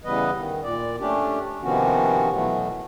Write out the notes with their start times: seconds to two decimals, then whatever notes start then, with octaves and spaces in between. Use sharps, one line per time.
0.05 C#3 E3 G3 B3 B4 D#5
0.37 D#3
0.63 A#2 D5
1.00 A3 C#4 D4 G4
1.63 C3 D#3 F3 B3 C#4 F#4
2.33 B2 E3 F#3 A3 B3